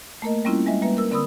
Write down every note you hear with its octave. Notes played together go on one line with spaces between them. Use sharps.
A3 A#3 A#4 D#5
G3 A#3 C4 C#4 E4 F4
G3 G#3 D#5 E5
G3 A#3 B4 E5
A#4 E6
D3 C4 A#4 B5 D#6 E6